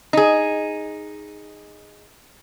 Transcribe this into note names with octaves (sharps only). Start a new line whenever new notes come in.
D#4 G#4